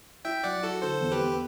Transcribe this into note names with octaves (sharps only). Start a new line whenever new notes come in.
E4 E5 G5
F#3 D5 F#5
E4 F#4 A4
D3 A4 C5
E2
G4 B4
B3